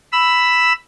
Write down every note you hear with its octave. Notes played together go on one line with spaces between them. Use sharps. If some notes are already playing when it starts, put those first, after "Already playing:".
B5 E6